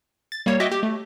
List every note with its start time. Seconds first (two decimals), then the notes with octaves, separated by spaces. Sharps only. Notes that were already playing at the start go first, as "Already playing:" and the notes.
0.32 A6
0.46 G3 A#3 C#5
0.60 F#4 D#5 E5 G5 D6
0.72 G4
0.83 A3